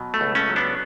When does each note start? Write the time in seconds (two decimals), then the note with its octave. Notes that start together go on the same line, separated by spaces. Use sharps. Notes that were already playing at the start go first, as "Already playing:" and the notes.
Already playing: B2 F#3
0.14 A3
0.21 C#2
0.35 A3 C#4
0.50 F#3
0.56 B3 D4